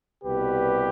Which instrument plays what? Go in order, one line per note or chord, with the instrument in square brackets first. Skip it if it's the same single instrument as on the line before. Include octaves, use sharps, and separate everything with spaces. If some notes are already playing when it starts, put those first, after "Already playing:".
[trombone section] C2 B2 G3 G4 B4